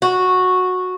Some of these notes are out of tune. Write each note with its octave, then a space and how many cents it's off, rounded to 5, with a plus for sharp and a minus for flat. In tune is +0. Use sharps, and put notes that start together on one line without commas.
F#4 -10